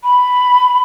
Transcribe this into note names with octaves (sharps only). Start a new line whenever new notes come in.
B5